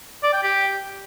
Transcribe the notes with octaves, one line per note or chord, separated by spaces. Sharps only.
D5
G5
G4